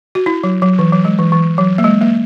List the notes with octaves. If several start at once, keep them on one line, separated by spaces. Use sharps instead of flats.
F#4
E4
F#3
F#3
E3
F#3
G#3
E3
E3
F#3
A#3
G#3
A#3